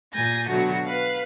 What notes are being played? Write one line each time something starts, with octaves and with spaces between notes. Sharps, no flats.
A#2 G#5 G6 A6 A#6
B2 D3 F#3 A3 F#4
B4 F5 F#6